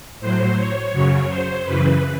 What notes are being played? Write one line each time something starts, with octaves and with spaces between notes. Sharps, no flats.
A2 F#3 C5
C#5
F#2 C#3 F#3
C5
F#2 C#3 E3 B4